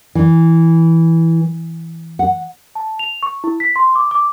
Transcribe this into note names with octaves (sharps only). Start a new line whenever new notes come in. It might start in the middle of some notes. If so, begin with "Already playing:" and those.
E3
F#5
A5
F7
C#6
E4
B6
C6
D6
D6